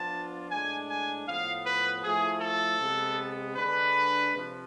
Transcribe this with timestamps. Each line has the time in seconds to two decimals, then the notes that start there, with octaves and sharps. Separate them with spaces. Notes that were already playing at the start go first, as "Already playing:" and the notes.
Already playing: F3 B3 D4 F4 A5
0.51 A2 G#3 D4 G#5
0.90 G#5
1.27 A2 F3 B3 F5
1.66 B4
2.04 F3 A3 E4 G#4
2.41 A4
2.80 C3 G#3 B3
3.56 D3 G#3 D4 B4
4.33 C3 F3